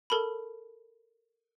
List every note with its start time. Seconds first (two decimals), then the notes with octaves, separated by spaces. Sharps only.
0.10 A4 A#4 A5 B5